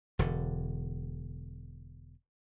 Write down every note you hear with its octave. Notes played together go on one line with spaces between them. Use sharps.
E1 D3